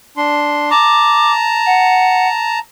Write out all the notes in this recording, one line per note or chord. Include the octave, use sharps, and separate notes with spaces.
D4 C6
A5 A#5 D6
F#5